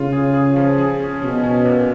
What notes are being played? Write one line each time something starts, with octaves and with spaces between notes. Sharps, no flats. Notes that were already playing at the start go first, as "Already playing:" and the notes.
Already playing: C#3 F4
G#4
G#4
F3
G#4
C#4
B2 C#4
C#4
A#2